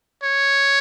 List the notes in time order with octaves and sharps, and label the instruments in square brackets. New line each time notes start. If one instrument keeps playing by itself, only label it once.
[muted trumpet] C#5